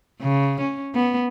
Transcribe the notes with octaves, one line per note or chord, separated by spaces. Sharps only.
C#3
C#4
B3